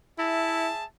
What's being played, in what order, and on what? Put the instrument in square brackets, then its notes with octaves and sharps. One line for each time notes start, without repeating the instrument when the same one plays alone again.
[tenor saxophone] E4 [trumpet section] G#4 E5 A5